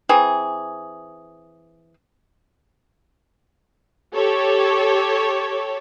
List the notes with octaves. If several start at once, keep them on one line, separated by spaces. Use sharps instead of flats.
E3 C4 G#4
G4 A4 C#5